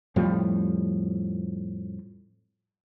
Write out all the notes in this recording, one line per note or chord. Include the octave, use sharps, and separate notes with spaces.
F2 A2 F3 G3